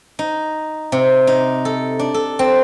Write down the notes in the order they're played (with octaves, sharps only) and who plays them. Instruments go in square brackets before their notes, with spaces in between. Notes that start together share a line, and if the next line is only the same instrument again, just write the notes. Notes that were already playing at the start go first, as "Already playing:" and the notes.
[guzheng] D#4
C3
D#4
A4
D4
A4
C4